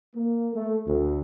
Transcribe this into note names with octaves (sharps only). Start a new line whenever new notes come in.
A#3
A3
D2